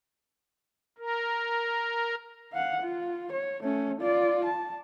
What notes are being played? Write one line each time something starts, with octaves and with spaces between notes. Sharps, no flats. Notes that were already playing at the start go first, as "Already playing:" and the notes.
A#4
F5 F#5
F4
C#5
A3 C#4
F4 D5
A5